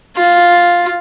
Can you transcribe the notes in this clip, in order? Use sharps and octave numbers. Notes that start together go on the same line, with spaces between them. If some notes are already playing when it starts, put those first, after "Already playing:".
F4